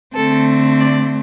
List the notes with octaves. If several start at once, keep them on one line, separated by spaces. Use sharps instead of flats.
D3 A3 C4 A4
D5